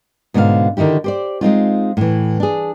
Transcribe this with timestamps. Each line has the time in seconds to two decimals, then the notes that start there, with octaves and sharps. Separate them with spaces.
0.34 G#2 B2 D3 A#4 F5
0.77 D3 D#3 D#4 E4 G4
1.04 G4 C5 D5
1.41 G#3 C4 D#4 F4
1.97 A2 E3
2.40 D4 G#4